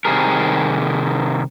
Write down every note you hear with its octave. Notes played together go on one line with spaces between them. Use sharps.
C3 D#3 G3 G#4 A#4